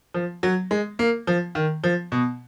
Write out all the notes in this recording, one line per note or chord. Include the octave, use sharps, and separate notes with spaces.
F3
F#3
G#3
A#3
F3
D#3
F3
B2